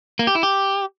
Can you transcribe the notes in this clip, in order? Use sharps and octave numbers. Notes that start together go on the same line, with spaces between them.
A#3
G4
E4
G4